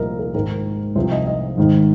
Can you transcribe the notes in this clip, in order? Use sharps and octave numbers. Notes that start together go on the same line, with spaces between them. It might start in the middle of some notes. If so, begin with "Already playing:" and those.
Already playing: C2 A#2 F3 A#4 D#5
A#4
G#1 G#2 D#3 A#4
C2 C3 F3 C5
D#5
D#5
G#1 G#2 D#3